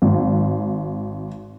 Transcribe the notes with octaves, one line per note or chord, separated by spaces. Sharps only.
G#1